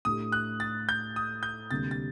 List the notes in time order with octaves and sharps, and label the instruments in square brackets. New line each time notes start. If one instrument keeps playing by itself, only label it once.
[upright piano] A2 A3 D4 G4 [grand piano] D#6
[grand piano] F#6
A6
G6
D#6
G6
[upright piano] D2 C3 G3 A#3 [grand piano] A6
[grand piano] A6